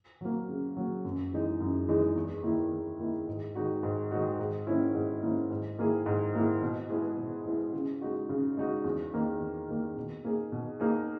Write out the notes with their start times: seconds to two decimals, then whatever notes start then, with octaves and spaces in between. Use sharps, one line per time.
0.21 F#3 A#3
0.49 C#3
0.77 F#3 A#3
1.05 F#2
1.32 E3 G#3 D#4 G#4
1.60 F#2
1.88 E3 G#3 D#4 G#4
2.16 E2
2.43 D#3 A#3 E4
2.72 E2
2.99 D#3 A#3 E4
3.28 G#2
3.55 D#3 G#3 D#4 F#4
3.83 G#2
4.11 D#3 G#3 D#4 F#4
4.39 G#2
4.67 D#3 A#3 C#4 E4
4.95 G#2
5.22 D#3 A#3 C#4 E4
5.51 G#2
5.78 D#3 A#3 E4 G#4
6.06 G#2
6.34 D#3 A#3 E4 G#4
6.62 B2
6.90 G#3 B3 E4 G#4
7.17 B2
7.46 G#3 B3 E4 G#4
7.73 C#3
8.01 G#3 D#4 F#4
8.29 C#3
8.57 G#3 D#4 F#4
8.84 E2
9.13 D#3 A#3
9.40 E2
9.69 D#3 A#3
9.96 B2
10.25 A#3 D#4 G#4
10.52 B2
10.80 A#3 D#4 G#4